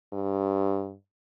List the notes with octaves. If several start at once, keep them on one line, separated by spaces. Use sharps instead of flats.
G2